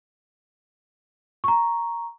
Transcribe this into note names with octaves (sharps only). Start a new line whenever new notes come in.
A#5 C#6